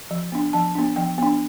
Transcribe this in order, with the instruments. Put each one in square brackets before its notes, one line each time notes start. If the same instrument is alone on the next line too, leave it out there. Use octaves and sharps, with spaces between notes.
[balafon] F3
B3 D4
F3 A5
B3 D4
F3 G5
B3 D4